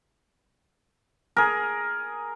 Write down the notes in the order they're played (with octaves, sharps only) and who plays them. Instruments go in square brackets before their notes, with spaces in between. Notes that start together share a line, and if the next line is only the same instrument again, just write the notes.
[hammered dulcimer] G#4 A#4